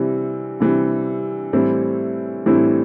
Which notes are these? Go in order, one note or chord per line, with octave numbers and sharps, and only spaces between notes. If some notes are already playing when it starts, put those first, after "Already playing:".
Already playing: C3 E3 G3
C3 E3 G3
A2 E3 G3 C4 E4
A2 E3 G3 C4 E4